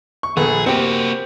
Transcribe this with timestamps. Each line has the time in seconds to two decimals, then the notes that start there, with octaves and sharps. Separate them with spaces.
0.23 C#6
0.37 A#1 B3 G#4 A4
0.66 A#3 C4 F#4 G4 G5